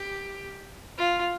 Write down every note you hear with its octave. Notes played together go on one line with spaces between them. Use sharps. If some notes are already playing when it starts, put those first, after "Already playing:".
Already playing: G4
F4